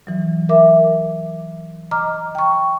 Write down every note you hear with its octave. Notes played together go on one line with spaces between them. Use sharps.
E3 F#3
A#4 E5 D6
D#5 A#5 D6 F6
G5 C#6